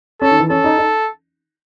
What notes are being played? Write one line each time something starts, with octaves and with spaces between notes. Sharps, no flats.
C#4 A4
D#3
E3
C#4 A4
D#4
D#4